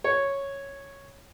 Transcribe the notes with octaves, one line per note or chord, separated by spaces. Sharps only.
C#5